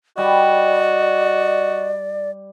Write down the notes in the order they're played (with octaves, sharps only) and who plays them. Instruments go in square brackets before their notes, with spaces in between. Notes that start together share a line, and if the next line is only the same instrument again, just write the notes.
[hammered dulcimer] G3 [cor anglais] F#4 [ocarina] D5 [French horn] D#5